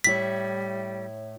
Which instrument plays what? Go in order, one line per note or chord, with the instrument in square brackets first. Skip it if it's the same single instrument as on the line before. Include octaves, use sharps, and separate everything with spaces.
[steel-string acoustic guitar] A2 E4 C#5 [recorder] G3 [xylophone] B6